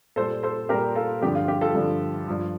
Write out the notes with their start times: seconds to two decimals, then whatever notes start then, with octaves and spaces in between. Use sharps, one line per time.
0.16 A#2 G3 A4 C5
0.43 A4 C5
0.69 A#2 G3 G4 A#4
0.95 F4 A4
1.21 G2 D3 F3 G4
1.35 F4
1.48 G4
1.61 F4 A4
1.74 G2 D3 F3
2.27 G2 F3